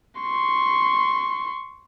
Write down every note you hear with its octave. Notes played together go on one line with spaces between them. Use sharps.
C6 C#6